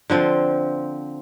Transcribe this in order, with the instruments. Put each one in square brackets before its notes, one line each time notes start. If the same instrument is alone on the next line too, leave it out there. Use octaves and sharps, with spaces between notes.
[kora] D3 F3 C4 C5